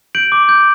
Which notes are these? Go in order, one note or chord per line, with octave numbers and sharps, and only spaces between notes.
G6 D7 F#7
D6
G6